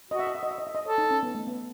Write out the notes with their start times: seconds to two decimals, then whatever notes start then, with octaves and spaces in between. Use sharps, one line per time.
0.10 F#4 D#5
0.19 E5
0.27 D#5
0.35 E5
0.43 D#5
0.51 E5
0.58 D#5
0.67 E5
0.75 D#5
0.85 A4 C#5
0.98 D#4
1.11 C#4
1.23 B3
1.35 A3
1.47 B3